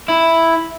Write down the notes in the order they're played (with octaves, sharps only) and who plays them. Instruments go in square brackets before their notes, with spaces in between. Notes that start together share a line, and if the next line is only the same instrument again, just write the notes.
[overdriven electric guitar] E4